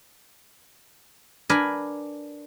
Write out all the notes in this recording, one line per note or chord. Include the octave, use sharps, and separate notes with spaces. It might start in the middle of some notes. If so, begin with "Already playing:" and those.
D4 A#4 B4 G#5 B5